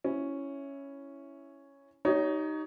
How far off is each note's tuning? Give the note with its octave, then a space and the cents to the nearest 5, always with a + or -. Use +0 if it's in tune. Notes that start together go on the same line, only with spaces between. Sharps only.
C#4 +0 E4 +0
D#4 +0 G4 -40 C#5 +25